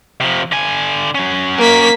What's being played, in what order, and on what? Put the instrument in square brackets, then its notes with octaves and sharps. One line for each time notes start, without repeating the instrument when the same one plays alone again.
[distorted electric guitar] C3 F3
D3 G#5
F#3 C#4
[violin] A#3 B6